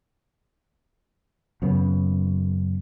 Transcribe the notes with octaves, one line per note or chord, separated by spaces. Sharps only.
F#2 C#3 B3